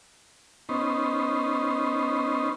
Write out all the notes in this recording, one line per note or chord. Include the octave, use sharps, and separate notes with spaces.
B3 C#4 D#4 C5